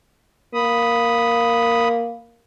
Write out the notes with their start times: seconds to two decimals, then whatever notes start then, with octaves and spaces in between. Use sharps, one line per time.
0.54 A#3 B5 D#6